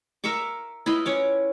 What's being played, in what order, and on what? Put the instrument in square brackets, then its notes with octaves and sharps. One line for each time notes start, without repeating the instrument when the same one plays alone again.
[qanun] A#4 E5 C#6 D6
E4 F4 B4 D#5
C#4 C#5 D6